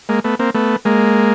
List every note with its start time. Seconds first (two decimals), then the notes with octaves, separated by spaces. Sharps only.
0.09 G#3 A#3
0.24 A3 B3
0.39 A#3 C4
0.54 A3 B3
0.85 G#3 A#3